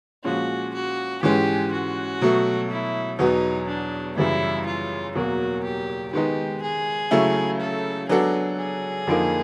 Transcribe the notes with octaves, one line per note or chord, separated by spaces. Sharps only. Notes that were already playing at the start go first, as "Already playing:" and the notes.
A#2 F3 G#3 C#4 F#4
F#4
G#2 E3 G#3 C#4 G4
F#4
B2 F#3 A3
E4
E2 B2 F#3 B3 D#4
D4
F#2 C#3 E3 G3 E4
F4
E2 B2 F#3 A#3 F#4
G4
D#3 G#3 B3 D#4 G4
G#4
C#3 F#3 A3 C#4 E4
A4
F#3 B3 D4 F#4 G#4 A4
G#4
F2 D3 F3 A#3 D#4